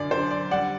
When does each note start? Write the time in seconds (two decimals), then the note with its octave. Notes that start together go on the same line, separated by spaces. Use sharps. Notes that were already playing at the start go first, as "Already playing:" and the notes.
Already playing: F#2 D3 D5
0.11 D3 C5
0.31 D5
0.51 G3 D5 F#5